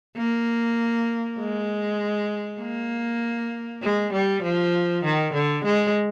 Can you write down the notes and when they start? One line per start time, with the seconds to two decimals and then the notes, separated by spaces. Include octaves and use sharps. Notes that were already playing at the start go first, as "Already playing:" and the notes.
0.17 A#3
1.39 G#3
2.61 A#3
3.83 G#3
4.13 G3
4.43 F3
5.04 D#3
5.34 D3
5.65 G#3